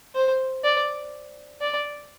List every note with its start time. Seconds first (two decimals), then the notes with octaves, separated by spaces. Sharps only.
0.15 C5
0.64 D5
1.61 D5